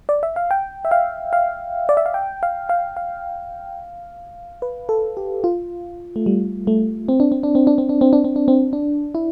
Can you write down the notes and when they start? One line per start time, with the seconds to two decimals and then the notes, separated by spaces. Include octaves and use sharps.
0.09 D5
0.23 E5
0.36 F5
0.51 G5
0.85 E5
0.91 F5
1.33 F5
1.89 D5
1.97 E5
2.06 F5
2.14 G5
2.43 F5
2.69 F5
2.97 F5
4.62 B4
4.89 A4
5.17 G4
5.44 F4
6.16 A3
6.26 G3
6.67 A3
7.09 C4
7.20 D4
7.32 C4
7.43 D4
7.55 C4
7.67 D4
7.78 C4
7.89 D4
8.01 C4
8.13 D4
8.24 C4
8.36 D4
8.48 C4
8.73 D4
9.15 E4